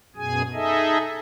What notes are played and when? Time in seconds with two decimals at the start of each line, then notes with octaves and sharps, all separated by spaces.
0.16 F#2 B2 G#4 G#5
0.53 D#4 G#4 A4 D#5 E5